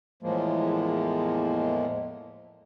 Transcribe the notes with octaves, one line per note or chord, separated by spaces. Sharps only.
E2 A2 F3 G#3 A#3